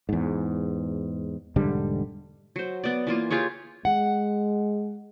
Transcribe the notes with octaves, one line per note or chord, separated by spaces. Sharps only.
E2 G#2
E1 G#2 D3 G3
F#3 C5
B3 D5
E3 A#3 F4
F4 G4 G#4 C#5
G#3 F#5